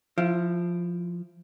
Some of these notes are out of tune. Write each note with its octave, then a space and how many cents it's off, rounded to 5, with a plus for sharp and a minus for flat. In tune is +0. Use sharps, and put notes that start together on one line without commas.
F3 +0 E4 +25